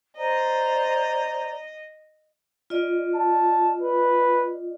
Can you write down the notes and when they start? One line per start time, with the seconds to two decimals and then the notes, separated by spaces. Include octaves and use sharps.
0.17 C5 D5 D#5 A#5
2.70 F4 D5 D#5
3.15 A5
3.82 B4